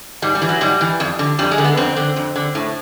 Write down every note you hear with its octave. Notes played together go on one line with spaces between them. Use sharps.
G#2 G3
G3
E3
F#3
G#2 G3
E3
F2
D3
F2 G3
G#3
D3
B3
F2 C4
D3
F2
D3
A2